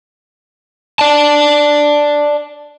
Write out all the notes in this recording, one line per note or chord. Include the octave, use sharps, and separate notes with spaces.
D5 A5